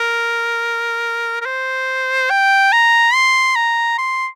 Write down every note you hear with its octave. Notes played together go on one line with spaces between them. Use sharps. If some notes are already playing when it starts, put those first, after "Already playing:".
Already playing: A#4
A#4
C5
G5
A#5
C6
A#5
C6